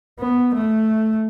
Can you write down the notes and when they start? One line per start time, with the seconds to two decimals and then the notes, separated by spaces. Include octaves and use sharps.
0.19 B3
0.54 A3